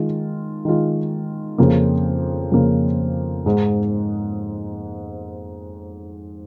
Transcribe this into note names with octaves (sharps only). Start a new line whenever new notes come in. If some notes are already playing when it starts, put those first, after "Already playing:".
Already playing: D#3 G#3 F4
D#3 G#3 F4
F2 C#3 A#3
F2 C#3 A#3
G#2 G#3 D#4